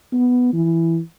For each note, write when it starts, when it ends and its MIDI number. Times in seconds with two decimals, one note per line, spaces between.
0.13 0.51 59
0.53 1.00 52